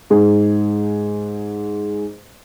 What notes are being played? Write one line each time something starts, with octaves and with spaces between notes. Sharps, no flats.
G#2 G#4